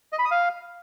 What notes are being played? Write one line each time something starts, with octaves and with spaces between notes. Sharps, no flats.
D#5
B5
D#6
F5